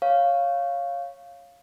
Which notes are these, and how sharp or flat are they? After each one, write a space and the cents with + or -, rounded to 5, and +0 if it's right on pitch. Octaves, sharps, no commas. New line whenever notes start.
C#5 +0 F5 +0